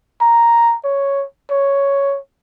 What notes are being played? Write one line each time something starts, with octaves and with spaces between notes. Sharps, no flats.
A#5
C#5
C#5